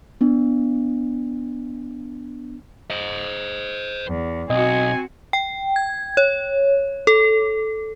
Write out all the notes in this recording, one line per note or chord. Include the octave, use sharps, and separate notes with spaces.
B3 D4
C5 D#5
E2
B1 C4 F#4 D#5 G#5
G5
G#6
C#5
A4